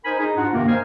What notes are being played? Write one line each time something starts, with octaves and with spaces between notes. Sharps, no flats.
D#4 A#4 C5 G#5 B5
D#4 G#4
G#2 D4 D#4 F4 F#4 F#5
G2 C3 D#3 A#3
D#4 A#4 C5 F5 G#5